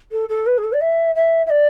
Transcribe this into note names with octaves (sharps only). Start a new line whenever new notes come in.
A4
A4
B4
G#4
A4
D5
E5
E5
E5
D5